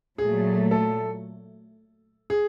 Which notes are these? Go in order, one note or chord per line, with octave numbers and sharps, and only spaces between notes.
A#2 F#3 A3 G#4
A4
G#4